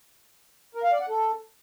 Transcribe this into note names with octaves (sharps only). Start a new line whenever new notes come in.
A#4
F5
D5
F#5
A4